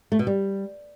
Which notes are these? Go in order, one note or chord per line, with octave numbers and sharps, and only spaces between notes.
A3
B2
G3